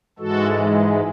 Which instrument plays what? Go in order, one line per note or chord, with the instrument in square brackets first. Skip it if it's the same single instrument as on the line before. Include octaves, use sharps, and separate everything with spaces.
[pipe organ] G#2 E3 G#3 F#4 A4